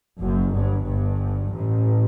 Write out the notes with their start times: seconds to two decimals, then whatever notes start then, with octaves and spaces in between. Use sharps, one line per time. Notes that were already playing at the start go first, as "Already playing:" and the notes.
0.20 F#1 F#2
0.52 G1 G2
0.85 G1 G2
1.51 A1 A2